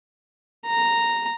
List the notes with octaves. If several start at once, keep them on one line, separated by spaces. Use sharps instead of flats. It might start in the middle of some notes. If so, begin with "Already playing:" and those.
A#5